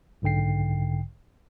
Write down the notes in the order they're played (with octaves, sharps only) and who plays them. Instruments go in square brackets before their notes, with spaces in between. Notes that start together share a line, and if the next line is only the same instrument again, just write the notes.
[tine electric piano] B1 G#2 D3 G5 C7